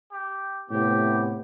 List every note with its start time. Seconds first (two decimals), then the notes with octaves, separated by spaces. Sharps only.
0.12 G4
0.70 A2 C3 B3 G4